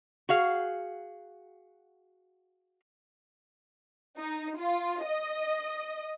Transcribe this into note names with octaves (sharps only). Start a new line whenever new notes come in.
F#4 G#4 F5
D#4
F4
D#5